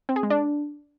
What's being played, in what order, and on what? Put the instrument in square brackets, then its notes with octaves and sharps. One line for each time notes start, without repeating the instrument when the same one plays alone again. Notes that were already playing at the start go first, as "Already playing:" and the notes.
[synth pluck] C4
G#4
G#3
D4